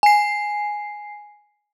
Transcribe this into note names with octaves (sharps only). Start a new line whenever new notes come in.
G#5 C7